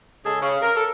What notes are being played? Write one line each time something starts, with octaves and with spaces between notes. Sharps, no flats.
C#3 G#3 G#4 A4
C#3
A#4
A4